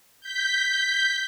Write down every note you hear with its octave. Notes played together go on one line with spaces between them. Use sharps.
G6 B6